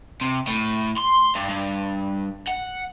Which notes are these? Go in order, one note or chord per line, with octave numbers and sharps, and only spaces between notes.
C3
A2
C6
G2
G2
F#5